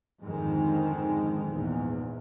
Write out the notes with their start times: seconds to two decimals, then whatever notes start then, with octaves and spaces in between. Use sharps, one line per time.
0.22 F2 G#2 D3 D#3 G#3
1.51 A#1 E2 G#2